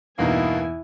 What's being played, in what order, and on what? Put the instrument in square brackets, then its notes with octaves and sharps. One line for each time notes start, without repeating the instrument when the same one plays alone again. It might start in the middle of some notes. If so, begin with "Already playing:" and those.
[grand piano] E2 [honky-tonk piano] G2 B2 D#4 [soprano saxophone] A#3 [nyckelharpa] E4 G#5